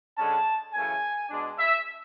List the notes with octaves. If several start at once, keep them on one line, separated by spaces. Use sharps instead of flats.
D3 G#3 C#4 A5
F#2 C#3 E3 A3 G#5
B2 G#3 D4
E5